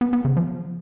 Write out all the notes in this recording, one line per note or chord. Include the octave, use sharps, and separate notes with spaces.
B3
B3
C#3
F3